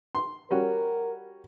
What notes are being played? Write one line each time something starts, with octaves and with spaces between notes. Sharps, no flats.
C6
G3 C#4 F#4 A#4